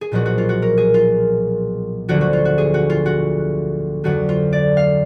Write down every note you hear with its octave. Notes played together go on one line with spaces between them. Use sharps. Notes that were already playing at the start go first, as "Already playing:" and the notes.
G#4
B1 A#2 F3 F#4
F#4
F4
F#4
A#4
G#4
F4
D2 D3 F3 F#4
F#4
F4
F#4
G#4
F#4
F4
F#4
F2 D3 F#3 F#4
F4
D5
F5